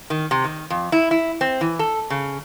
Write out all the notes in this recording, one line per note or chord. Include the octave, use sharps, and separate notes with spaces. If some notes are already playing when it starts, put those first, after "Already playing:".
D#3
C3
D#3
F2
E4
E4
C4
E3
A4
C#3